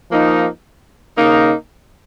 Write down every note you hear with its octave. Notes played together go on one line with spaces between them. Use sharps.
F3 A#3 D#4
C#3 A#3 D#4